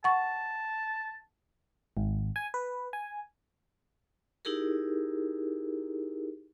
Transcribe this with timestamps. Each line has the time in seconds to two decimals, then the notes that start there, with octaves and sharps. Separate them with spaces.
0.04 F#5 A5 C#6
1.97 G#1
2.36 G#5
2.54 B4
2.93 G#5
4.45 D#4 E4 G4 G#4 A#4